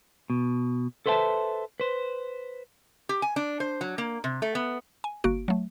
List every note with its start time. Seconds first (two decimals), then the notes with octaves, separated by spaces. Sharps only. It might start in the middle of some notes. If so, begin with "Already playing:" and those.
0.30 B2
1.06 A4 B4 C5 E5 F#5 A5
1.80 B4 C5
3.09 G4
3.22 G#5
3.36 D4
3.60 C5
3.81 F#3
3.98 A#3
4.24 C3
4.42 A3
4.55 B3
5.04 G#5
5.24 G1 A#3 F#4 D7
5.48 F#3 A3